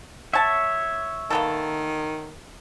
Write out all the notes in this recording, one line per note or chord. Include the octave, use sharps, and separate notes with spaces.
C#5 E5 F#5 A5
D#3 A#3 B3 A4